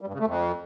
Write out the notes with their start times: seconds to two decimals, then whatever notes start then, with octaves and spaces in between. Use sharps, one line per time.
0.01 G3
0.07 G2
0.14 C#3
0.20 A3
0.26 F2